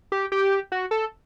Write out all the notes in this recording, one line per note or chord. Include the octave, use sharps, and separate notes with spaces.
G4
G4
F#4
A4